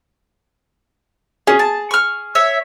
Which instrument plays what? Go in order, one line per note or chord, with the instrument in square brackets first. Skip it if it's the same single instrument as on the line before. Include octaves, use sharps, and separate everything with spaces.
[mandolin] C#4 [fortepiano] G#4
[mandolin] A5
C#6 F6
C#5 E5